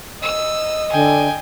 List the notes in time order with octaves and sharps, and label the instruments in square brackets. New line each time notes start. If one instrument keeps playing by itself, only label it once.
[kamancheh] D#5 [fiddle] E6
[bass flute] D3 [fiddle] G5 G#5